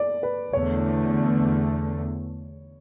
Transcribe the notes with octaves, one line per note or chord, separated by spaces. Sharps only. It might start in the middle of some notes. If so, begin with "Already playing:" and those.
Already playing: D5
B4
E2 D3 A3 C#5